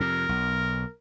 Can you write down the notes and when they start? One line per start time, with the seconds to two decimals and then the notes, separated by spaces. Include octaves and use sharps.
0.01 F2 C3 A#4
0.29 B1